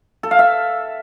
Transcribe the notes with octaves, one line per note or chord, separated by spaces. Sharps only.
A4
F5
E5